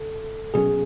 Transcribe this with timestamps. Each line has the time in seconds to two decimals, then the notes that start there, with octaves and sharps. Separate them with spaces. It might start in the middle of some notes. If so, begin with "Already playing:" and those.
Already playing: C#3 A4
0.54 B2 F#3 C#4 G#4